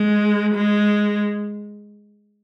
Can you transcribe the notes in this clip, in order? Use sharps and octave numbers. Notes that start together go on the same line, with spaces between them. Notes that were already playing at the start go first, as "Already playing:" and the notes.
Already playing: G#3
G#3